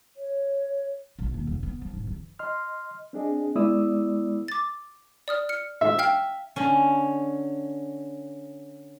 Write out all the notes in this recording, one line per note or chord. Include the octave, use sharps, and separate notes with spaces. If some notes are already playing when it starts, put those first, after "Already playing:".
C#5
A#1
D#2
F1
B3
F3
G#2
E3
D#5 C6 F6
C4 D4 G#4 D#5
G#3 B3 E4 D5 D#6 E6
D6 A6
D5 D#6 F6
F6 C#7
E5
F5 G5 F6
D3 C#4